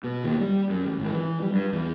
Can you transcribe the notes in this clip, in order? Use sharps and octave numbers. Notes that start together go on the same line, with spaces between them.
B2
D#2
G3
F#2
A1
G#1
E3
G3
G2
E2